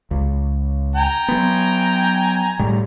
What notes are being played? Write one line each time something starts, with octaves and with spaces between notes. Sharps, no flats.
C#2
G5 G#5 A#5
F#3 B3
A2 G3